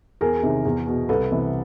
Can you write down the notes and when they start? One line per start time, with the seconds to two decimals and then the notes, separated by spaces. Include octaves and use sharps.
0.21 E2 G#4 A#4
0.43 C3 D#3
0.65 E2
0.87 B2
1.09 C2 A4 B4
1.31 C3 E3